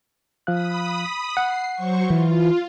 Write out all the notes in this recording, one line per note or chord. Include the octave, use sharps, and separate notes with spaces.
F3 F5 B5 D#6 F#6
F#5 C7
F#3 C5 C#6
E3 F4